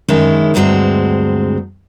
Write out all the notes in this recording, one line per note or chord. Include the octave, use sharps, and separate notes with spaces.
F#2 D#3 G#3 C#4 E4
D2 G2 F#3 G#3 C4